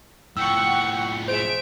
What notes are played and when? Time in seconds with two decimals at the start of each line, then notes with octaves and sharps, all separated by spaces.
0.37 A2 F3 F#5 G5 C#6 E6
1.28 G#4 C5 E5 D7